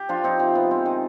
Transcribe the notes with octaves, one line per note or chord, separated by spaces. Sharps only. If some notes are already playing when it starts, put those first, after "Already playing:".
Already playing: G4
F3 D4 F4
F3 C4 D#4
C3 C4
C3 B3
G#3 C4
D#3